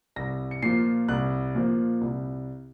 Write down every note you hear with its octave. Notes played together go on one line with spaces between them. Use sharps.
C2 A#6
C#7
A#2 F3 C7
C2 F#6
A#2 F3
C2